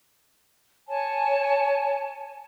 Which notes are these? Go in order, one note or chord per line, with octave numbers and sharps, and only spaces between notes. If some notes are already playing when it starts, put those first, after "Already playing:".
C#5 G#5 A5